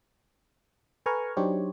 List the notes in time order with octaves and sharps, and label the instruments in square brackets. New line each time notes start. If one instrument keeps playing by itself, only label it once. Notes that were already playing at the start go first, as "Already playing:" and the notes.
[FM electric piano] A4 B4 G#5 A#5 C#6 F6
F#3 D4 D#4 G4 C5 C#5